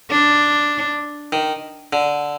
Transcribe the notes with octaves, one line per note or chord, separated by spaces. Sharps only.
D4
D#3
D3